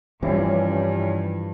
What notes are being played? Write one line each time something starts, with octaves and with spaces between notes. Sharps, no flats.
G2 E3 F3 C4 C#4 E4 G4